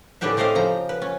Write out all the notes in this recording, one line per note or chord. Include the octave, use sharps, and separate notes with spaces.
A2 C#3 D4 G4 B4 E5
A3 C4 G4 C5 D#5 F5
C#3 F3 A#5
B4
C#4